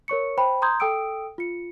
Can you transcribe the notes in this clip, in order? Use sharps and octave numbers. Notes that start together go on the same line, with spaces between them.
A#4 C#5 C#6 C#7
C5 G5 B5
A#5 C6 D#6 G6 G#6
A4 G5 D#6 E6 D7
F4 C#7